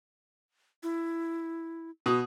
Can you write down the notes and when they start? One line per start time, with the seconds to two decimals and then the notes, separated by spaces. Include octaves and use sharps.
0.83 E4
2.06 B2 D#6